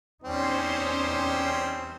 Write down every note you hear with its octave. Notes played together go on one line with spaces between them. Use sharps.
E2 G3 C4 C#4 D#4 C5